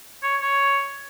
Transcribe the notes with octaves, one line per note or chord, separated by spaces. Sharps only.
C#5
C#5